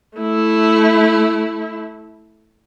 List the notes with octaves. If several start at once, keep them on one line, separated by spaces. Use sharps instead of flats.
A3 E4